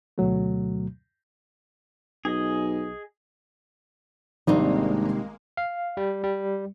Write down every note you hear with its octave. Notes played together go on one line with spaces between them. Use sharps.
D2 B2 F#3 A3
B1 G#4 D#5
G#1 C3 D#3 G3 G#3 A#3 D4 D#4
F5
G3
G3